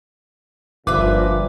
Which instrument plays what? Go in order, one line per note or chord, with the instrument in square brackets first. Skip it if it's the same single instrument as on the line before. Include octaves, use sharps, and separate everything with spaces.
[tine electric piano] G1 [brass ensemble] G2 A#2 F3 [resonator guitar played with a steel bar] B4 E5 [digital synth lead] D6